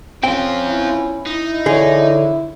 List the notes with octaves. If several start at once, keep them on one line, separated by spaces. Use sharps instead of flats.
C4 C#4 F4 G5
E2 E4
D#4 E4
D3 E3 F3 E4 G#4 C#5